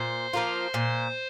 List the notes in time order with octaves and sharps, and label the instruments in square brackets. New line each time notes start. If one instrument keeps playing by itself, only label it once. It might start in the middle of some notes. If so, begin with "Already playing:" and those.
Already playing: [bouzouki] A#2 [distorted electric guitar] C5
[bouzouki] F3 A#3 F4
A#2